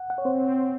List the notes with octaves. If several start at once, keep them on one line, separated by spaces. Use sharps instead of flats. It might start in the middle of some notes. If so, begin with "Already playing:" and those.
Already playing: F#5
F#5
C#5
C4 C5